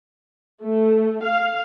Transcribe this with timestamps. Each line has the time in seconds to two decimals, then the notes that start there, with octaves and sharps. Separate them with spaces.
0.63 A3
1.22 F5